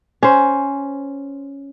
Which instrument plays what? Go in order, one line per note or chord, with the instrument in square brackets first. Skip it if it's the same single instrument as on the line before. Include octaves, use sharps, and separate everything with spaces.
[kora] C#4 C5